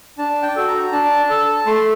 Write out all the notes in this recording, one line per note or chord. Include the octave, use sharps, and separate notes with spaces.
D4 A5
G5
F#4 A4
A#5
D4 A5
A4
A3 C6